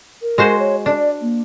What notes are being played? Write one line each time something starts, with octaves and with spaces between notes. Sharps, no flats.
A#4
G#3 F#4 C5
C#5
D4 D5
A#3